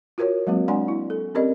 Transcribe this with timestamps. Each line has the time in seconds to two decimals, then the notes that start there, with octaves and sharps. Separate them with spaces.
0.18 F4 F#4 A#4 C5 C#5
0.47 F#3 G#3 A#3 C4 F#4
0.68 G#3 D4 D5 F#5 G#5 C6
0.88 E4
1.10 A4
1.35 C4 C#4 G4 A#4 D5 D#5